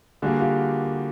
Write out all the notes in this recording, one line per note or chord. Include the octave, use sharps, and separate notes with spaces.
D3 G3 A#3 F#4 G#4
F4 G4